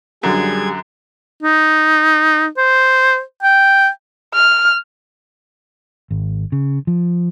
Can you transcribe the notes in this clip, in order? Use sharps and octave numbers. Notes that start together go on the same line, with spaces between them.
F#2 D3 G3 G#4 G#6
D#4
C5
G5
F6
G#1
C#3
F3